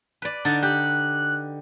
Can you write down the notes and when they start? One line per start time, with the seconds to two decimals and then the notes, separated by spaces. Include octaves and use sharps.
0.22 B4 D5
0.45 D3 D#4 A6
0.63 G4 F#6